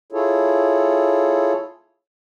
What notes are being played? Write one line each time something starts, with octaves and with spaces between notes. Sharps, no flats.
E4 F4 G#4 A4 C#5